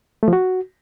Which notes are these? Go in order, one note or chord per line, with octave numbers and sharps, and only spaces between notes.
A3
F3
F#4